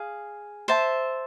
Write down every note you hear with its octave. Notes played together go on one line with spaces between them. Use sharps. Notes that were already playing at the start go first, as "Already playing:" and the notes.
Already playing: G#4 F5
C5 E5 A5